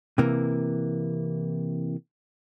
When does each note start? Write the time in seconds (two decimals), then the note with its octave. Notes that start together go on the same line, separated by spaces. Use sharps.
0.18 C3 E3 A#3